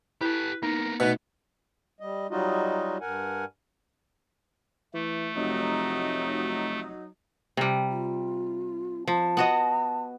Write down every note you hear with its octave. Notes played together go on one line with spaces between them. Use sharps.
E4 G4 A4 B4
A#3 B3 D#4 A#4
B2 A3 B3 D#4 B4
G3 D#5
F#3 G3 D#4 F4 F#4 D#5
G2 A#4 F#5 G#5
E3 A3
F1 F#3 D#4
C3 G3
F4
F3 A5
B3 F#4 D#5